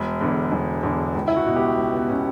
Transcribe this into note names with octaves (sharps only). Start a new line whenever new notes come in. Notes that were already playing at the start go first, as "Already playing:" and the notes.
Already playing: E1
E2 D3
E1
E2 D3
C#2
E4
F#4
B2
G4
C#2
B3
B2 C#4